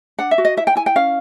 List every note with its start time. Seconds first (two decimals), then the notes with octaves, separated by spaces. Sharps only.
0.18 D4 F#5
0.31 E5
0.38 F#4
0.45 D#5
0.57 E4 E5
0.67 G5
0.75 E4 G#5
0.86 G5
0.96 C#4 F5